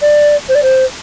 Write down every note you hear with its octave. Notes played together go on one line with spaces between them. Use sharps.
D5
C5
D5
C5